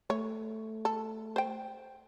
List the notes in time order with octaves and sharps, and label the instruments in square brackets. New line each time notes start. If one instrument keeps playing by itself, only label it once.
[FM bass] A3 [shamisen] C#5
[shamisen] A4
C5 G5